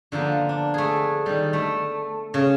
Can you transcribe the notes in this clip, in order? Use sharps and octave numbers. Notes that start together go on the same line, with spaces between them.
D3 F3 A#3 B3
D4
A3 G#4
D#3 G3
A3
C#3